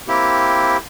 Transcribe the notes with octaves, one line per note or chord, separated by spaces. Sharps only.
A#3 C4 E4 G4